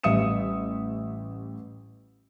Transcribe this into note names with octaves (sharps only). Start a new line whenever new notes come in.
A1 G3 E5 D#6 C#7 E7